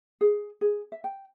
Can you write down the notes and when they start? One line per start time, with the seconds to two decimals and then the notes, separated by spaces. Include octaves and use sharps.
0.21 G#4
0.61 G#4
0.92 E5
1.04 G5